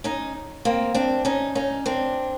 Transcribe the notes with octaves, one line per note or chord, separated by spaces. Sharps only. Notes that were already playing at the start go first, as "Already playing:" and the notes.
C#4 D#4
A#3 C4
C4 D4
C#4 D#4
C#4 D#4
C4 D4